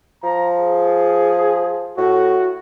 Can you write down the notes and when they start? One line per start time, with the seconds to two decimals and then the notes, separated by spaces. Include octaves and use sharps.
0.23 F3 A#5
0.59 G#4
1.97 A2 F#4